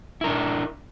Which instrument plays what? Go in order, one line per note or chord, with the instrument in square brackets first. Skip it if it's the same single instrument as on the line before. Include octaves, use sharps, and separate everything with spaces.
[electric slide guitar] E4
A#4
D4